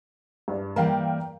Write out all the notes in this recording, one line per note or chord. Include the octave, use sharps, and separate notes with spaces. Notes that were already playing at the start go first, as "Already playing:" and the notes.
G2 D4
E3 G3 A#3 A#4 F5 G5